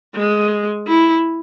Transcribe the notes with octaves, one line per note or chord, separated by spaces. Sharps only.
G#3
E4